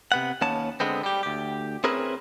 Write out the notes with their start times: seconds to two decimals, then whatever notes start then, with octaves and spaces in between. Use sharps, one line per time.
0.12 C3 B3 F#5
0.41 D#2 A#3 B3 C#4 A5
0.80 D3 G#3 B3 C4
1.03 G3 G4
1.23 D2 G4
1.84 C4 C#4 E4 G#4 A#4 B4